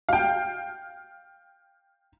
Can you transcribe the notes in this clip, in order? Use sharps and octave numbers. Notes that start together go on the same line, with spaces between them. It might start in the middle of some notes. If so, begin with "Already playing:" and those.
F5 G5